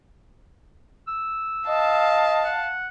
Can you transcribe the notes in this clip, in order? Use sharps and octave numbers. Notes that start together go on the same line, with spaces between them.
E6
D#5 F5 A5
F#5